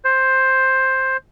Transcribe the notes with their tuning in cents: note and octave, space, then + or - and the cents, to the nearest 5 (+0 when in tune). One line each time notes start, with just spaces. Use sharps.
C5 +10